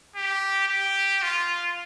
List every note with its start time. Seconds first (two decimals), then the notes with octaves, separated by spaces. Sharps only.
0.16 G4
0.69 G4
1.22 F4